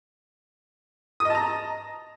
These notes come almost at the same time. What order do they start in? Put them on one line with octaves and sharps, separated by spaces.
D#6 D#5 A5 A#5